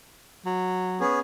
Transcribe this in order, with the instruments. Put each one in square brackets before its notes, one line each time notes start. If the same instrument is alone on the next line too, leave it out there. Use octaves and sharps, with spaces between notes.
[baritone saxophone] F#3
[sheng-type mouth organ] B3 C#4 G#4